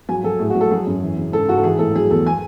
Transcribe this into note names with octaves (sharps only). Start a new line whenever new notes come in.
F#3 G#5
F#3 A4
A2 G#4
F#4
F#3
A4
F#3 G#4
F#2
E3
C#3
G#2 A4
G#2 F#4
A4
E3 G#4
A2 A4
F#3 G#4
E2 A4
G#5